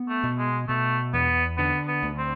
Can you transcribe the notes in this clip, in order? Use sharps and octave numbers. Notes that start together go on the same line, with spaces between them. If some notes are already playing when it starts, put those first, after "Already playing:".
Already playing: B3
A3
B2
G#3
B2 A3
E2 B3
D3 B3
B3
D2
C4